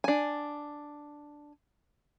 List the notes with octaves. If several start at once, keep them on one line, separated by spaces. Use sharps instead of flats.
D4 G#5